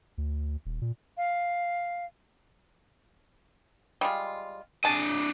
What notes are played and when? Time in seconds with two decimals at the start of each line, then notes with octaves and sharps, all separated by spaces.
0.18 D2
0.65 D#1
0.81 A#2
1.17 F5
4.01 G3 G#3 F4
4.84 D4 G#4 D#5 A5